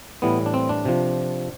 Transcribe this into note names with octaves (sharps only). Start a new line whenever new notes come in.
A2 E3 G3 B3
D4
C4
D4
C3 F3